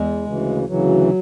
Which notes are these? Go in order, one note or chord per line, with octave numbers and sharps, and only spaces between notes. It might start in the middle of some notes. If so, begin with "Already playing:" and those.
Already playing: E2 G#3
D2 C#3 E3
D2 C#3 E3 F#3